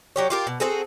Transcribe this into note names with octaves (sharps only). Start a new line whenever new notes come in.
F#3 G4 C#5
F4 G4 A#4
B2
C4 F#4 G#4 A4